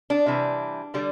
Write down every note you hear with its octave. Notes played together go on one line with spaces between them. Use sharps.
D4
C3 E3 G3
D3 G3